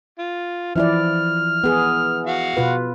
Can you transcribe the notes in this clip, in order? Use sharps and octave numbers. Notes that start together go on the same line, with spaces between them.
F4
E3 F3 E4 D5 F6
B3 G#4
F#4 F5
B2 F4 B4